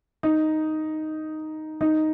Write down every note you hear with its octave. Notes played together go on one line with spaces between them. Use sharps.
D#4
D#4